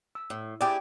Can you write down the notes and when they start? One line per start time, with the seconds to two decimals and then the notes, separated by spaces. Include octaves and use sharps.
0.15 E6
0.30 A2
0.61 E4 G4 G#4 D5 G5